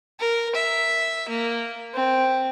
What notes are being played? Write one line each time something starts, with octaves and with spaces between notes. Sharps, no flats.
A#4
E5
A#3
C4